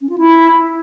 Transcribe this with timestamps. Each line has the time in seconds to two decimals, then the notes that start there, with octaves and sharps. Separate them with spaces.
0.01 C#4
0.09 F4
0.18 E4